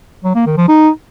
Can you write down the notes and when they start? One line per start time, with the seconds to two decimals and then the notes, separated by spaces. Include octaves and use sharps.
0.24 F#3
0.35 A#3
0.46 D#3
0.57 F3
0.68 D#4